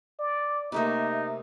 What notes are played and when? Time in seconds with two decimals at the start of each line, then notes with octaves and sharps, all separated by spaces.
0.19 D5
0.72 C3 A3 A#3 D#4